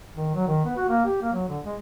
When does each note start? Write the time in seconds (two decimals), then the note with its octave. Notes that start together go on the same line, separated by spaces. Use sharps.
0.16 D#3
0.35 F#3
0.47 D#3
0.65 B3
0.77 F#4
0.89 A#3
1.05 G4
1.22 A#3
1.33 F#3
1.48 D3
1.65 G#3